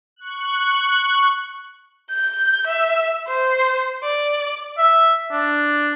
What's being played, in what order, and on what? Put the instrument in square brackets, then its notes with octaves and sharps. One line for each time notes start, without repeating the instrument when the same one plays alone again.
[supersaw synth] C#6 F#6
[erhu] G6
E5
C5
D5
[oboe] E5
D4